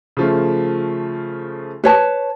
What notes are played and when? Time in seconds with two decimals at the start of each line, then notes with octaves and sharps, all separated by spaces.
0.17 C#3 F3 A3
1.84 B4 C#5 A5